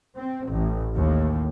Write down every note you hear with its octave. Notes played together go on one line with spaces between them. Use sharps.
C4
A1
D#2 A2